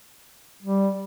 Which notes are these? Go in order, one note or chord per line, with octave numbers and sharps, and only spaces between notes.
G3